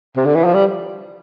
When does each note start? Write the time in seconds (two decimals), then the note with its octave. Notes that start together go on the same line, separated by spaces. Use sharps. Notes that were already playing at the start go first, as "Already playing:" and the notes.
0.16 C3
0.25 D3
0.35 E3
0.44 F3
0.54 G3